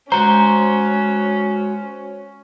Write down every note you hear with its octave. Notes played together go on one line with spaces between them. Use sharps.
G#3 C#4 F#4 C5 A#5